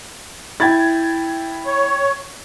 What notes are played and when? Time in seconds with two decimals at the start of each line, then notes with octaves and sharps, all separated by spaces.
0.60 E4 G5 G#6 A6
1.66 C#5